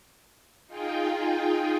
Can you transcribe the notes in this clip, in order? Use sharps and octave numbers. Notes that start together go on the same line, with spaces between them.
D#4 F4 G#4 G5